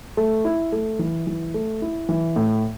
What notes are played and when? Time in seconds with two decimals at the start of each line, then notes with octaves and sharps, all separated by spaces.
0.17 A3
0.45 E4
0.72 A3
0.99 E3
1.27 E3
1.54 A3
1.82 E4
2.09 E3
2.36 A2